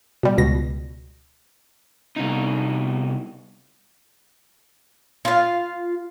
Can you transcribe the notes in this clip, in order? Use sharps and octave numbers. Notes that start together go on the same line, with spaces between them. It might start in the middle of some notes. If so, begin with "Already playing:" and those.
B2 G3
C#2 B2 A#6
C2 D#4
F4 F5